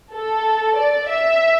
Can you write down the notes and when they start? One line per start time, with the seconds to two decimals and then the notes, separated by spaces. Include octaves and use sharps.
0.13 A4
0.77 D5
1.09 E5